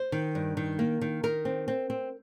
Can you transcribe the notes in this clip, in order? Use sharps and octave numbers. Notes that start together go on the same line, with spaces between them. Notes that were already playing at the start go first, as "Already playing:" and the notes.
Already playing: C5
D#3
G2
D#3
A#3
D#3
D#3 A#4
C4
C4
C4